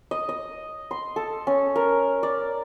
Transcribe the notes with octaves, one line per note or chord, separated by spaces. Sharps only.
D#5
D#5
C6
A4
C#4
A#4
D5